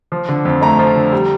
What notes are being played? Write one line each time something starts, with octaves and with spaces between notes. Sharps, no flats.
F3
D3
F2
A3 A#5
F3
D3
G3